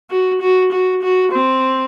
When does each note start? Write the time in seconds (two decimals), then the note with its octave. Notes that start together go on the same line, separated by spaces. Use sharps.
0.10 F#4
0.41 F#4
0.72 F#4
1.03 F#4
1.32 C4